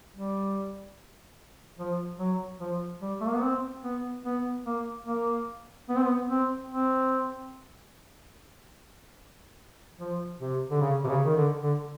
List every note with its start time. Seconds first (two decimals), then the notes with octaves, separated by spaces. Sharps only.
0.15 G3
1.79 F3
2.19 F#3
2.60 F3
3.01 G3
3.20 A3
3.27 A#3
3.35 B3
3.42 C4
3.83 B3
4.25 B3
4.65 A#3
5.06 A#3
5.89 B3
5.96 C4
6.03 B3
6.30 C4
6.71 C4
10.00 F3
10.41 C3
10.71 D3
10.81 C#3
11.04 C3
11.08 C#3
11.25 D#3
11.36 D3
11.63 D3